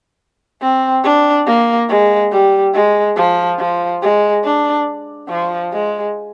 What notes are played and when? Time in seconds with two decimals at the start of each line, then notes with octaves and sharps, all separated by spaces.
0.62 C4
1.04 D4
1.47 A#3
1.89 G#3
2.32 G3
2.74 G#3
3.17 F3
3.59 F3
4.02 G#3
4.44 D4
5.30 F3
5.72 G#3